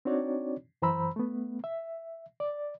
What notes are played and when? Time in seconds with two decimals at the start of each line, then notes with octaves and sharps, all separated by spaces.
0.05 C4 D4 D#4 F#4 C#5 D5
0.82 F#2 E3 C5 A#5 B5 E6
1.16 A3 B3
1.64 E5
2.40 D5